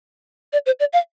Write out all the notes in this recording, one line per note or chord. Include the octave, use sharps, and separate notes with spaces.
D5
C5
D5
F5